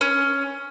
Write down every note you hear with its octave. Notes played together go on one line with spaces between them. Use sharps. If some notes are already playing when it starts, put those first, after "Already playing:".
C#4